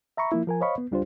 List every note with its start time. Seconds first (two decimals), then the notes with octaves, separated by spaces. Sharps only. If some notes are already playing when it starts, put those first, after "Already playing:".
0.17 E5 A#5 B5 C#6
0.32 F3 A#3 E4
0.47 F3 A#4 G#5
0.61 C5 C#5 D#5 F5 B5 C#6
0.78 B3
0.91 C#2 G3 D4 F4 G4 C5